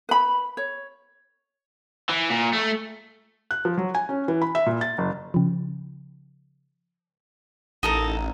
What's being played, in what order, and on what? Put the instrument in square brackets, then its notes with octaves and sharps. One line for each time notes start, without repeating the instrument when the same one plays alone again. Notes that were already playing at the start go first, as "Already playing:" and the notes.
[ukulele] B4 B5
C#5
[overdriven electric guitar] E3
A#2
A3
[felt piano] F#6
F3
F#3
G#5
C#4
E3
B5
E5
A#2
A6
F#1
[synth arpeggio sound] C#3 F3
[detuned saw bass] A1 [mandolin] D#4 A4 A#4